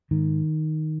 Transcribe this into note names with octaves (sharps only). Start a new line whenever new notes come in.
G#2 D#3